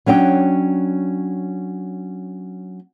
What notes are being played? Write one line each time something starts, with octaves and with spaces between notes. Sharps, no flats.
F#3 C#4 D4 G5